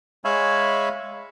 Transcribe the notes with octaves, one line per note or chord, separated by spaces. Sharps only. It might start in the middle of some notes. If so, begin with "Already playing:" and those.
G#3 C#5 E5 F5 G#5 B5